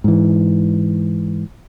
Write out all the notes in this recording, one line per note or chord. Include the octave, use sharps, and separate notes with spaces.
G#2 E3